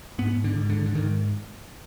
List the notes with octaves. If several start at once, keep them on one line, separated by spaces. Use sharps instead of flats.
G#2 B3
D3
G#2
D3
D3
G#2 D#3